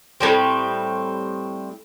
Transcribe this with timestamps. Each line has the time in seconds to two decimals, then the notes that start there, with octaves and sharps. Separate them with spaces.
0.20 A2 G3 C4